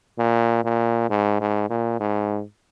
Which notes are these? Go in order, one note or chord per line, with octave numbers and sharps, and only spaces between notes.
A#2
A#2
G#2
G#2
A#2
G#2